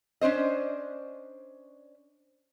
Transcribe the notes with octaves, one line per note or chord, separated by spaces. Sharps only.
C#4 D4 C5 D#5